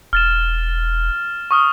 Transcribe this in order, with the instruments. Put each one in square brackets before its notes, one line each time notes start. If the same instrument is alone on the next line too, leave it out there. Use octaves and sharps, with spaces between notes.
[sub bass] E1 [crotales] F6 A6 E7
[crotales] C#6 D#6 F6